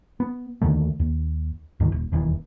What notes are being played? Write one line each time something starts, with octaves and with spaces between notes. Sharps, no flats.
B3
D#2 D3 D#3 A3
D#2
D2 G#2 D3 D#3
D#1
E1 D#2 C3 E3